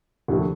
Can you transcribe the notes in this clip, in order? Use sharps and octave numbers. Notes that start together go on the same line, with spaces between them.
F1 D#2 D3 F3 A3